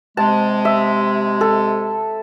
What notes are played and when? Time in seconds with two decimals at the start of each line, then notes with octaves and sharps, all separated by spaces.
0.17 C3 G#3 A5
0.65 E5
1.41 A4